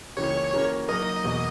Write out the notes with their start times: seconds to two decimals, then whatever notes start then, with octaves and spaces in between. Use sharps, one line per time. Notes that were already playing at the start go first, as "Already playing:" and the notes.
0.17 C#2 C#3 E3 A#3 C#5
0.53 E3 A#3 C#4 F#4 A#4
0.88 F#3 A#3 D#4 A#4 D#5
1.24 E2 B2 A#3